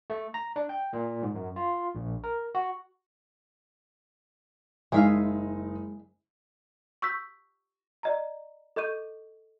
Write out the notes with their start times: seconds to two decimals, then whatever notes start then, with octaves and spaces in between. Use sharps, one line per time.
0.10 A3
0.34 A#5
0.56 D4
0.69 G5
0.93 A#2
1.23 G#2
1.35 F#2
1.56 F4
1.95 A#1
2.24 A#4
2.55 F#4
4.92 F#1 G#3 D#4 G#4 E5 F5
7.02 C#6 E6 G6 B6
8.03 D5 D#5 A#5
8.76 A4 D#5 C#6 G6 D#7